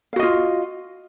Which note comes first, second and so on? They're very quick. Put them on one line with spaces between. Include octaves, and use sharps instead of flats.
F5 F#4 D#5 F4